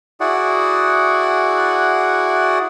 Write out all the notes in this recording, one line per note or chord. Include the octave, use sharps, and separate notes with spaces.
E4 F#4 G#4 D5 F#5